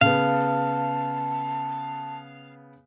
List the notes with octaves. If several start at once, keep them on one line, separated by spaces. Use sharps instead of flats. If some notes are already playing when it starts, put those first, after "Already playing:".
C#3 B3 F5 A5